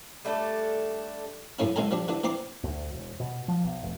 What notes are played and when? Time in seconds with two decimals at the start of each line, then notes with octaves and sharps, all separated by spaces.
0.25 G3 A3 D4 A4
1.59 F#2 A2 A3 C#4 E4
1.76 B1 C#3 G#3 A4 G#5 A#5
1.91 F3 G3 D4
2.08 D3 E3 D4
2.24 E3 C4 A#5 C6 D6
2.64 D2
2.93 E1
3.20 B2
3.48 F3
3.64 B1
3.83 F1